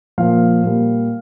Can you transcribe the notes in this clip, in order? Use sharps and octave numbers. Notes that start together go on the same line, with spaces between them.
A#2 F3 F5
A#2 G3